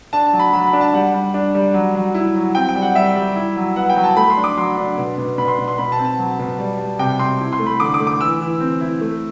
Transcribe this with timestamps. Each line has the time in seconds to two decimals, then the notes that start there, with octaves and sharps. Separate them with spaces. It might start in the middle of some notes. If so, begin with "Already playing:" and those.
0.13 D4 A5
0.27 A5
0.33 F#3
0.39 B5
0.53 F#3 B5
0.67 B5
0.73 D4
0.81 A5
0.94 G3 F#5
1.14 G3
1.34 D4
1.55 G3
1.74 F#3
1.95 F#3
2.14 E4
2.35 F#3
2.55 C4 G5
2.69 G5
2.75 G3
2.82 F#5
2.95 G3 E5
3.16 G3
3.36 E4
3.56 F#3
3.76 B3 F#5
3.89 G5
3.96 F#3
4.04 A5
4.17 A3 B5
4.30 C6
4.37 D4
4.44 D6
4.57 F#3 C6
4.78 D4
4.98 B2
5.18 B2
5.38 B2 B5
5.48 C6
5.58 B2
5.68 C6
5.78 B2 B5
5.92 A5
5.98 C4
6.05 A5
6.19 F#3
6.39 B2
6.59 G3
6.79 G3
6.99 C3 G5
7.19 C4 C6
7.40 E4
7.53 C6
7.60 A3
7.66 B5
7.80 D3 D6
7.94 D6
8.00 A3
8.07 D6
8.20 E3 E6
8.41 E3
8.60 C4
8.81 E4
9.01 A3